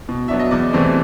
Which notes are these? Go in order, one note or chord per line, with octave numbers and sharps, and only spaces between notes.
B2
F#3 B3 D4 E5
D#5
E2 D5
C3 E3 A3 C4